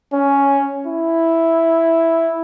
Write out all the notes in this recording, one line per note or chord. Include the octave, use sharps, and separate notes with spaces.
C#4
E4